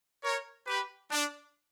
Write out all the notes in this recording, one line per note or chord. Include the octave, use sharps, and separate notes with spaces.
A#4 C#5
G4 B4
D4